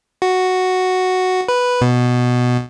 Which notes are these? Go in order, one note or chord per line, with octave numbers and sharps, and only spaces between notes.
F#4
B4
B2